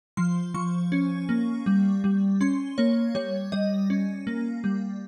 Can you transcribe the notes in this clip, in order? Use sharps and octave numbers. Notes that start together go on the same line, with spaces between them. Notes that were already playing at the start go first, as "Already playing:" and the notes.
F3 C6
F3 C#6
C#4
A#3
G3
G3
C#4 C6
A#3 C#5
G3 C#5
G3 D#5
C#4
A#3
G3